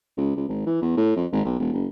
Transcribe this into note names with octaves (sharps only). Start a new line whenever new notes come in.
C#2
C#2
G#1
E3
E2
A2
F2
G#1
B1
E1
F#1